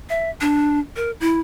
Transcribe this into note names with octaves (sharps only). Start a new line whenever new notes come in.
E5
D4
A#4
E4